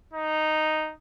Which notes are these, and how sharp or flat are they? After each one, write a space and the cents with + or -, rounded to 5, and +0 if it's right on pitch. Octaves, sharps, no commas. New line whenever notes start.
D#4 -5